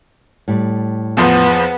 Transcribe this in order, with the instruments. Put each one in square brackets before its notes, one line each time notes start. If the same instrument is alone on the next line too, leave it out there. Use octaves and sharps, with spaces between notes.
[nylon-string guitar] A2 G3
[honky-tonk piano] E2 F3 C5 [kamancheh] B3